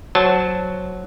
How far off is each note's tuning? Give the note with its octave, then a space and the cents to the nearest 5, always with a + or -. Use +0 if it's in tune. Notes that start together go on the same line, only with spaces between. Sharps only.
F#3 +0 C5 +0 A5 +0